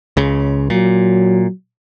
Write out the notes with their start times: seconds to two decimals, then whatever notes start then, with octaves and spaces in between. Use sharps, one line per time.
0.17 C#2 C#3
0.70 A#2 F#3